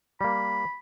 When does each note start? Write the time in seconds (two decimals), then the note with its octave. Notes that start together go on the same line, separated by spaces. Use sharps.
0.21 G3 A#3 B5